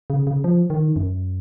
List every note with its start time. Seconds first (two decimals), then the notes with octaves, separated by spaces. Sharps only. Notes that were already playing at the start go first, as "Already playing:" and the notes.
0.10 C#3
0.27 C#3
0.44 F3
0.70 D#3
0.96 F#2